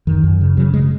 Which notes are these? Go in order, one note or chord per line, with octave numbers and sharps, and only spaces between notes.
F#2 D#3
F#2
C#3
C#3 F#3
C#3 G#3